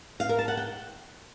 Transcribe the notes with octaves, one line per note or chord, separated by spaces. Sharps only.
F5
A#4
A5
F#5
G5